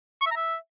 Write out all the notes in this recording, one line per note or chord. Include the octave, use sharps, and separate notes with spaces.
C#6
E5
A#5
E5